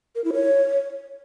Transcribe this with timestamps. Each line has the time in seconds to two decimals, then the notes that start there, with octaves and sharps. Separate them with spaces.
0.15 A#4
0.24 E4
0.33 C#5